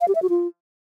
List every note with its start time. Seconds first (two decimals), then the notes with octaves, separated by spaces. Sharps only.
0.01 F5
0.08 G4
0.15 E5
0.22 F#4
0.30 F4